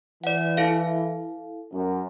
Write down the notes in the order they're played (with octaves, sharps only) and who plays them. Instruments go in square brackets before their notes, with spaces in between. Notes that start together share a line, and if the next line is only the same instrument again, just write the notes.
[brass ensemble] E3 [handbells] D5 F#5
[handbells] E4 A4 F5
[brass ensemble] F#2